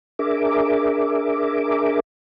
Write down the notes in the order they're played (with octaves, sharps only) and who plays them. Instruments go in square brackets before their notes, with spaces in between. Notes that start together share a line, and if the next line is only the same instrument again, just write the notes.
[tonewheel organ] D4 G#4 A#4 E5 D6